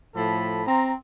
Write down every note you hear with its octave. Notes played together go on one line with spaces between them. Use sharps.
A2 F3 A4 B5
C4 A#5